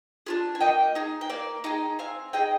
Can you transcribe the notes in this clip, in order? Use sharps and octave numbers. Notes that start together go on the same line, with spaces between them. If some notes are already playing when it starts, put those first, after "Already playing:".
D4 F4 G#4
G#5
A#3 D#5 G5
D#4 G#4
G5
A#3 D5 F5
D#4 G#4 D#5 G5
C4 F5 G#5
D#4 G#4 D#5 G5